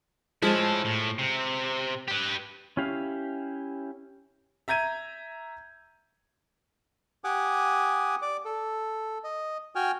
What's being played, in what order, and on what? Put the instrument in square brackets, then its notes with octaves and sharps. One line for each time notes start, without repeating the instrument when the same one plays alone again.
[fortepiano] F3 G#3 [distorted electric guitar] E4 A4
[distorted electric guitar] A2
C3
G4 B4
[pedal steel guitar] C#4 E4 G4 F5
[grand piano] E5 A#5 G6 G#6 D#7
[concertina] G4 F#5 G#5 D6 D#6
D5 D6
A4
D#5
F#4 G5 G#5 F6